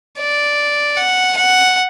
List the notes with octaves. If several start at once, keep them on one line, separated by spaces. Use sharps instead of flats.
D5
F#5
F#5